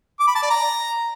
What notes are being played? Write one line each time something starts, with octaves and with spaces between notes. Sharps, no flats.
D6
B5
A5
D5
A#5